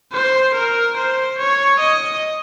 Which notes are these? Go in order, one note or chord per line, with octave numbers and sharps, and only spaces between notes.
C5
A#4
C5
C#5
D#5